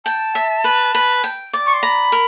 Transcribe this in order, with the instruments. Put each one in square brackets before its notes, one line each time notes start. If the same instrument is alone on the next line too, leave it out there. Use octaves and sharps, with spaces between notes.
[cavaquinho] G5 [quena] A5
[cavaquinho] E5
B4
B4
G5
D5
[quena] C#6
C6
[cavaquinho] A#5 [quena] B5
[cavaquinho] A#4